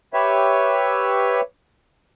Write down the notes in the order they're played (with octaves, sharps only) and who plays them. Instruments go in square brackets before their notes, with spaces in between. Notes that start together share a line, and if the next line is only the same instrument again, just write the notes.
[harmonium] G4 B4 C#5 E5